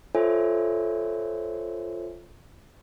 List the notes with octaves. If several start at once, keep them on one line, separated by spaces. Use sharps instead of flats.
F4 A4 C5 C#5 E5 G#5